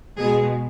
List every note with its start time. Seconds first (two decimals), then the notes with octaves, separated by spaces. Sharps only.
0.18 B2 G#3 G#4